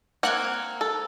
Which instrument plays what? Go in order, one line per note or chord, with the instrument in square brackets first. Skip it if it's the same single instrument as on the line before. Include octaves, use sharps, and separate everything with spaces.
[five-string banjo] A#3 C4 [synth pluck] F#5 F#6 G#6
[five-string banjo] A4